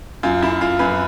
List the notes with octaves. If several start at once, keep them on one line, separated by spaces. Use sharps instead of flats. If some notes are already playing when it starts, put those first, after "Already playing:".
F#2 F4
F#2 E4
F#2 F4
F#2 B4